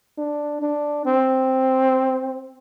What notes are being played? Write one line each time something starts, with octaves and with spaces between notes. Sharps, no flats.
D4
D4
C4